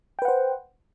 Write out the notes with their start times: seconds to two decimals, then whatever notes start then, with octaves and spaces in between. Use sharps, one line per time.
0.19 G5
0.22 B4
0.25 F#5
0.28 C5